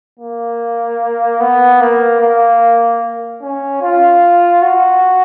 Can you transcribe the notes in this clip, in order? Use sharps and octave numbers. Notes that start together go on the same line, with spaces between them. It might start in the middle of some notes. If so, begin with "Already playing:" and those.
A#3
B3
A#3
A#3
C#4
F4
F#4